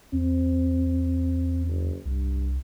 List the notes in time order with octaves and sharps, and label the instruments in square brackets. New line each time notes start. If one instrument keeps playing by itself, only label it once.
[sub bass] E2 [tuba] C4
[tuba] F#1
[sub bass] C2 [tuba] G2